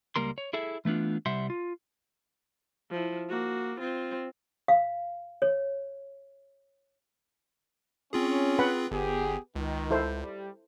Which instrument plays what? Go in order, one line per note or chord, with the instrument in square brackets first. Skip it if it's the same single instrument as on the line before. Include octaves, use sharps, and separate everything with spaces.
[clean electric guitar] C#2 G3 A#3 A#4 C6
C#5
E4 G#4 A4 E5
E3 A3 B3 D4 F4
C2 G3 C5 E5 F#5 C6
F4
[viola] F3 E4
A#3 F#4
C4 F4
[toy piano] F5
C#5
[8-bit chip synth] C4 F4 G#4 [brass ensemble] C#4
[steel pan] B4 F#5 B5
[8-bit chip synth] G1 [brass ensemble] B3 G4 G#4
[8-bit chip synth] C#2 [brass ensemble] D#3
[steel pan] E4 A4 C5
[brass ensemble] G3